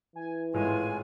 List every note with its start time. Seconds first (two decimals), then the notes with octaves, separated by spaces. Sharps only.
0.16 E3 G#5
0.54 G#1 A2 G#3 F4 G#5